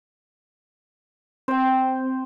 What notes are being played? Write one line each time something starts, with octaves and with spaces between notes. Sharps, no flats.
C4 C5 G5